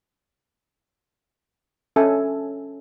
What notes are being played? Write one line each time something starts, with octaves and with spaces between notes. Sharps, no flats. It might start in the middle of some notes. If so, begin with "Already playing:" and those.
C#4 A4 E5 G#5 A5